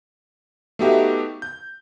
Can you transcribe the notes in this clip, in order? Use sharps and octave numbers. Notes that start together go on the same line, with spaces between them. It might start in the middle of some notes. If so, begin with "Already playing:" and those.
A3 B3 D#4 F#4 G4 E5
G6